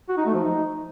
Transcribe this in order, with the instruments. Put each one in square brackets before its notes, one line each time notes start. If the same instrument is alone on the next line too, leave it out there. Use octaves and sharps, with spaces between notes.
[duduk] F#4
D#4
A3
F3
D#4